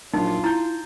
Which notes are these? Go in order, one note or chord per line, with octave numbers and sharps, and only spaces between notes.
A#1 F#3 A#3 D#4 F4
E4 A#5 G6 A6